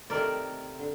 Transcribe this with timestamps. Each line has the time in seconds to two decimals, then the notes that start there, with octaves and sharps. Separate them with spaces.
0.10 C3 D#3 A3 A#4 D5
0.79 D3